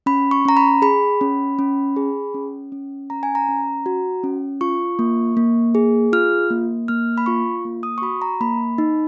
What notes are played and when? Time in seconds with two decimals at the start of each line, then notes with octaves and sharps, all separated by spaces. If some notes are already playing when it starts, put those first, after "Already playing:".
0.06 C#4 B5
0.31 C#6
0.45 C#4 A#5
0.57 B5
0.82 G#4 B5
1.21 C#4
1.59 C#4
1.96 G#4
2.34 C#4
2.72 C#4
3.10 C#4 A#5
3.23 G#5
3.35 A#5
3.48 C#4
3.86 F#4
4.24 C#4
4.61 F4 C#6
4.99 A#3
5.37 A#3
5.75 G#4
6.13 F4 F6
6.50 A#3
6.88 A#3 F6
7.18 B5
7.26 F4 C#6
7.65 A#3
7.83 D#6
7.98 C#6
8.02 F#4 B5
8.22 A#5
8.40 A#3 B5
8.78 D#4